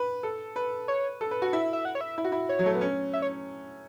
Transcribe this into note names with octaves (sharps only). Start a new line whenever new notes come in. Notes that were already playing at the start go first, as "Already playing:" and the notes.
Already playing: B4
A4
B4
C#5
A4
B4
F#4
E4 E5
E5
F#5
C#5
E5
E4
F#4
E4
C#5
F#3
A3
B3
C#4
E5
C#5